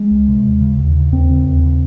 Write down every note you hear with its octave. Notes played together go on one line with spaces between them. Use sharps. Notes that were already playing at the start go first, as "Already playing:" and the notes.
Already playing: G#3
C#2
C3
D#2
C#3
D#2
C#3
D#2 C4
C#3
D#2
C#3